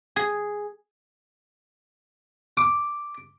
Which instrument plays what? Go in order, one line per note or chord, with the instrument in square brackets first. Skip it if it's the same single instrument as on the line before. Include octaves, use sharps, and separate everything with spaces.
[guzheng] G#4
[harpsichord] D6